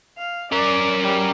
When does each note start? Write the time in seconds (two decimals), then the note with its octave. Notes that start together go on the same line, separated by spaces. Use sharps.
0.18 F5
0.52 C#4 A#4 D5
1.02 G3